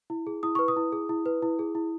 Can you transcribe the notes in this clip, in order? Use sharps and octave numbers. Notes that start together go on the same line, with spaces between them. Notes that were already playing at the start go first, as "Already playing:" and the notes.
E4
G#4
E4 D#6
B4 C#6
D#6
E4
G#4
E4
B4
E4
G#4
E4